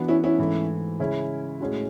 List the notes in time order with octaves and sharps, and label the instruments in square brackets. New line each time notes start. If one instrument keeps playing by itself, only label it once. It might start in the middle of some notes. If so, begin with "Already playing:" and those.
Already playing: [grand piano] E3 B3 D4 F#4
[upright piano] C#4 E4
C#4 E4
[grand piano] G#2 E3 A3
C#3 G#3 C#4 E4
A2 G#3 C#4 F#4